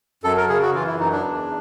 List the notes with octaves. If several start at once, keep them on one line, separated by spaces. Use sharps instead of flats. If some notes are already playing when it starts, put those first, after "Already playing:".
F#2 A4
A#4
C#3 G#4
F#4
E3 F4
E4
F#2 D#4
D4
E2